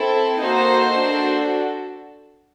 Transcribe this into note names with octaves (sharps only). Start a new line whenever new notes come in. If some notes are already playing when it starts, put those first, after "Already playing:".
Already playing: C4 E4 A4
A#3 D#4 F#4 A4 C5
D4 F#4 A4